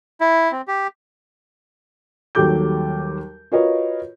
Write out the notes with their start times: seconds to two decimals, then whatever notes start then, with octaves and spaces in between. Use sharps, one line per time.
0.21 E4
0.52 C4
0.68 G4
2.35 D#2 F#3 G3 A4 D6 G6
3.52 F4 F#4 A#4 B4 C#5 D#5